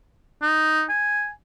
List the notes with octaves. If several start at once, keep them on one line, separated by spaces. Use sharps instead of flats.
D#4
G#5